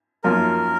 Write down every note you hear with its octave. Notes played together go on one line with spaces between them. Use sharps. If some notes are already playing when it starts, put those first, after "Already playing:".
F#2 F3 A#3 F4 A#4